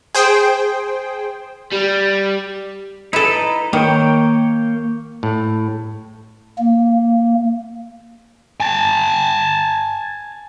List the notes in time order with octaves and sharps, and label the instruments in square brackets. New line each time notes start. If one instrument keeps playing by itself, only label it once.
[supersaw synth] G#4 C5 G5
[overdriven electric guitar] G3
[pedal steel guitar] D#4 B4 [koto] E4 A4
[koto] D#3 [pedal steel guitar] A#3 C#5 G5
[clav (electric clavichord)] A2
[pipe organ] A#3
[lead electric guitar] G#5 A5